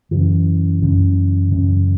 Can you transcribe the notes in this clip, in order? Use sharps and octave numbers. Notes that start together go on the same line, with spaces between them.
F#2 C#3 E3
F#2 C#3
F#2 C#3